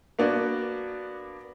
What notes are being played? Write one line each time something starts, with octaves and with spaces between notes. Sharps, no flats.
A#3 B3 D4 F#4